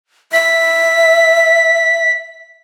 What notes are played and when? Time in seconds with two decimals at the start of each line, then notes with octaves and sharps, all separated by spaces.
0.33 E5 B6